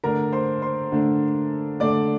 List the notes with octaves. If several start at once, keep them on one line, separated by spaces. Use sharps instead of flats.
D3 A3 D4 A#4 A#5
C5 C6
C5 C6
D3 A3 D4
D3 A3 D4 D5 D6